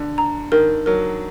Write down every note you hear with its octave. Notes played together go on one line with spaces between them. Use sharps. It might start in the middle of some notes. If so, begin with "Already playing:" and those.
Already playing: D3
A#5
D#3 A#4
F#3 A#4